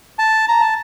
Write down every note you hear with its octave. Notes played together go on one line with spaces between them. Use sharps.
A5
A#5
A5